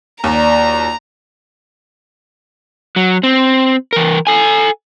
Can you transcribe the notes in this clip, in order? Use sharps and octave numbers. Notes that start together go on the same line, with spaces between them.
D#2 F4 F#4 D5 A#5
F#3
C4
E3 A#4
A4 G#5